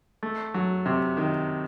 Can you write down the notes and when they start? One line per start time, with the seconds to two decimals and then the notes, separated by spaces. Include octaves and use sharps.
0.23 A3
0.54 F#3
0.86 C3
1.17 D#3